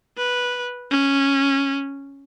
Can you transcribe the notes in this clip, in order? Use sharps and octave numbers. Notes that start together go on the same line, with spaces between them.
B4
C#4